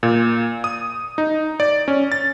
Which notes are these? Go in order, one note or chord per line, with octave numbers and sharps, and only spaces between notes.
A#2
D#6
D#4
D5
C#4
A6